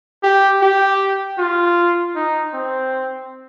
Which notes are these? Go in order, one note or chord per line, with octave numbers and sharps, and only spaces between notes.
G4
G4
F4
D#4
C4